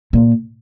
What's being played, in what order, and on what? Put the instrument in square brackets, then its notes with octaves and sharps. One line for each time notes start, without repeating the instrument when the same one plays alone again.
[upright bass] A#2